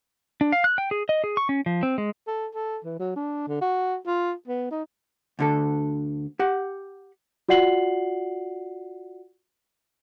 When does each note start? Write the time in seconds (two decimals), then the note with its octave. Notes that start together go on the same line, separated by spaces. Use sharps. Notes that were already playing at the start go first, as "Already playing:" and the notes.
0.41 D4
0.52 F5
0.64 F#6
0.78 G5
0.91 G#4
1.09 D#5
1.24 G#4
1.37 C#6
1.49 C#4
1.66 F3
1.83 C4
1.98 G#3
2.27 A4
2.54 A4
2.85 E3
2.99 F#3
3.16 D4
3.48 D3
3.61 F#4
4.07 F4
4.48 B3
4.71 D#4
5.39 D2 D3 A4
6.39 G4 F#5
7.49 F4 F#4 D5 F#5 C7 F#7